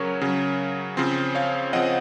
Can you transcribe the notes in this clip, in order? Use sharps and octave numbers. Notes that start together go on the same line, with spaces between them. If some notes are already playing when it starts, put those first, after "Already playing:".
Already playing: C#3 F#3 C#4 A#4 C#5
C#3 F#3 C#4
C#3 F3 C4
C#5 F5
C#3 F3 C4 D#5 F#5